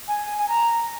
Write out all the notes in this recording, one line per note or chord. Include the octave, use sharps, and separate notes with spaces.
G#5
G#5
A#5